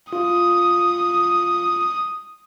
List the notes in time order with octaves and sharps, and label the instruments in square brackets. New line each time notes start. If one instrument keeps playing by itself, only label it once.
[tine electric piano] F4 [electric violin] D#6